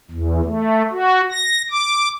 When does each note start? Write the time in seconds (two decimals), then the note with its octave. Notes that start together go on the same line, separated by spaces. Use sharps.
0.11 E2
0.45 A3
0.90 F#4
1.32 A#6
1.71 D6